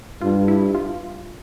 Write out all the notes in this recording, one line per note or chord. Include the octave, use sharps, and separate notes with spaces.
G2 F4
E4
F4